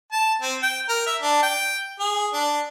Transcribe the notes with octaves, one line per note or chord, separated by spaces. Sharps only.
A5
C4
G5
A#4
E5
D4
G5
G#4
D4